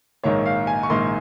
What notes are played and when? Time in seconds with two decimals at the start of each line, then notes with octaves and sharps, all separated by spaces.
0.24 A#1 G#2 D#3 A#3 C#5
0.46 F5
0.67 G#5
0.83 C#6
0.90 A#1 G#2 D#3 A#3 C6